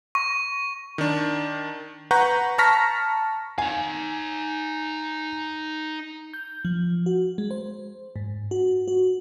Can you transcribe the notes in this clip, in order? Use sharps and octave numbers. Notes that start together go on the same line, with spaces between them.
C#6
D#3 D4
B4 F#5 A#5 C#6 G6
A5 A#5 C#6 F6 A#6 B6
D#4 F5 G#5
G6
F3
F#4
G#3
C5
G#2
F#4
F#4